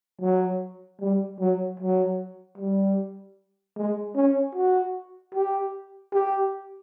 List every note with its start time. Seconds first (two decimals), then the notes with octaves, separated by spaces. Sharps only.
0.21 F#3
1.01 G3
1.40 F#3
1.80 F#3
2.58 G3
3.76 G#3
4.16 C#4
4.55 F#4
5.34 G4
6.13 G4